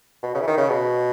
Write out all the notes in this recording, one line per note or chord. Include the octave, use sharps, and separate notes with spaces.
B2
C#3
E3
D#3
C#3
B2